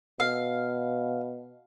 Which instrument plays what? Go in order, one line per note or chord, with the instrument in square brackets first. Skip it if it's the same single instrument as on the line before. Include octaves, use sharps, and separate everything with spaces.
[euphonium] B2 [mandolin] F5